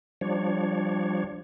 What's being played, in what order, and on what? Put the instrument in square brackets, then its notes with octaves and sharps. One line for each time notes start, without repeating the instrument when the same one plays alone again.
[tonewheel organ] F3 G3 D4 C#5